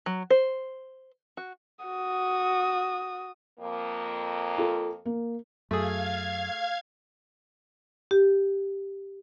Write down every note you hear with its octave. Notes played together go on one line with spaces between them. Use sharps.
F#3
C5
F#4
F#4 D#6
F2 A#3
F4 A4
A#3
F#2 A3 G#4 F5 G#6
G4